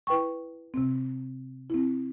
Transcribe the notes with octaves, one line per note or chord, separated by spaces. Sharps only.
E4 B4 G5 C#6
C3 C4
C4 E4